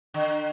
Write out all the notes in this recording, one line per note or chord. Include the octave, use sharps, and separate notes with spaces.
D3